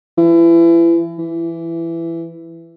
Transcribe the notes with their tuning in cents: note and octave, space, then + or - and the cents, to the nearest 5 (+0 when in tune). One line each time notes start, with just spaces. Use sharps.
E3 +30
E3 +15